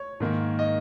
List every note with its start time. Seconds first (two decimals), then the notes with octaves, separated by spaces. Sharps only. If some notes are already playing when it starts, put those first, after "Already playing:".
Already playing: C#5
0.20 G#2 D#3 A#3
0.59 D#5